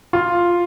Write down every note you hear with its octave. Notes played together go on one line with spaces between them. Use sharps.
F4